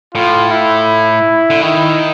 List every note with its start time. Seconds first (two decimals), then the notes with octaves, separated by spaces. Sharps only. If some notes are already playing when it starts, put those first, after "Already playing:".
0.14 A2 F4
0.51 E4
1.50 D3
1.62 D#3 E4